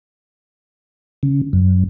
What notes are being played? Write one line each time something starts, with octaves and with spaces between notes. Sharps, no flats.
C#3
F#2